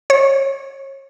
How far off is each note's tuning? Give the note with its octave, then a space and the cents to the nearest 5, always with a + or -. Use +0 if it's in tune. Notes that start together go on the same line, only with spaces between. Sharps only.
C#5 -30